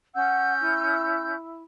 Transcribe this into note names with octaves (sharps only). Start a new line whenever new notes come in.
C#4 F#5 E6 G6
E4